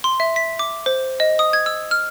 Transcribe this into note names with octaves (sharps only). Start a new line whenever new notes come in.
C6
E5
B6
D6
C5
D#5
D#6
G#6
E6
F6